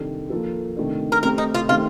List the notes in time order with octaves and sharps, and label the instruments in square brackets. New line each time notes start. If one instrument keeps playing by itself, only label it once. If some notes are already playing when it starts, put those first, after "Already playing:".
Already playing: [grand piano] C3 D#3 G3 D4 A4
F3 A#3 F4 A4
C3 D#3 A3 D4
[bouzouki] A#4
[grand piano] A3 C4 G4 [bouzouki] A#4
[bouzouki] D#4
F4
[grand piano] D#3 A3 C4 G4 [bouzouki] F4